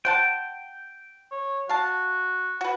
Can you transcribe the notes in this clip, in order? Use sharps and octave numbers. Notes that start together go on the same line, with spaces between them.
C5 F#5 G5 A5
C#5
F#4 F5 A5
F#4 B4